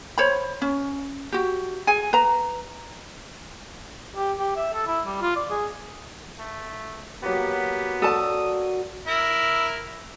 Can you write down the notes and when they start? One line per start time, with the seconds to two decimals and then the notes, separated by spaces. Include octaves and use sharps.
0.18 C5 C#5 B5
0.62 C#4
1.32 F#4 G4
1.87 G#4 G#5
2.13 B4 A#5
4.16 G4
4.39 G4
4.56 E5
4.73 A4
4.87 E4
5.06 G3
5.21 F4
5.36 D5
5.50 G#4
6.39 A3
7.23 F#3 A#3 B3 G4
8.02 F#4 A4 D5 A5 D#6
9.07 E4 A#4